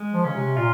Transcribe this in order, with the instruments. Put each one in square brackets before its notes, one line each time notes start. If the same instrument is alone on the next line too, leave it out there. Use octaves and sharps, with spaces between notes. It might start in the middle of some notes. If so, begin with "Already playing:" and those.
Already playing: [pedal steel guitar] G#3
[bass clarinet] F3
[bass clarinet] C#3 [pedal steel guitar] C#4
[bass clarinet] C3
[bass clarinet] A#2 [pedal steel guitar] F4